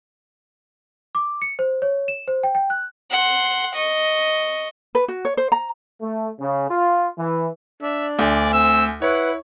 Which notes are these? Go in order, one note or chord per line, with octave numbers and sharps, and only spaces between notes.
D6
C#7
C5
C#5
E7
C5
G5
G5
F#6
F#5 C6
D#5 C#6
B4
F#4
C#5
C5
A#5
A3
C#3
F4
E3
D4 E5
D2 D5 G#5
C4 E6
E4 B4 C#5 F#5